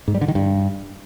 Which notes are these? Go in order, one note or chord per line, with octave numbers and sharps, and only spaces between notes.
G#2
G3
D3
D#3
G2